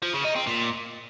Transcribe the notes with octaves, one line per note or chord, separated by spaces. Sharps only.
F3
C#3
D#4
C4
A#2